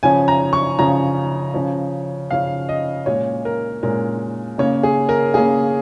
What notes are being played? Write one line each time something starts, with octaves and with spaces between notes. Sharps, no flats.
C#3 F3 C#4 G#5
A#5
C#6
C#3 F3 C#4 A#5
C#3 F3 C#4
C#3 F3 C#4 F5
D#5
A#2 G#3 C#4 C#5
A#4
A#2 G#3 C#4 A#4
C#3 A#3 C#4 C#5
G#4
A#4
C#3 A#3 C#4 G#4